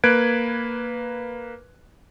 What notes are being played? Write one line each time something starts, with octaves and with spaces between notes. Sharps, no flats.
A#3 B4 F#6 G#6 D7